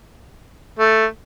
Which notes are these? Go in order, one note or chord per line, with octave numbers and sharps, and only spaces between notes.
A3